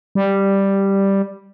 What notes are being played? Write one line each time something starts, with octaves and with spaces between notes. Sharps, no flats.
G3